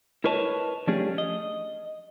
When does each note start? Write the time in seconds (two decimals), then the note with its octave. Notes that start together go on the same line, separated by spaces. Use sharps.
0.24 E4 A#4 B4 C#5 D#5 A5
0.87 F3 A3 C#4 D4 G4 G#4
1.18 D#5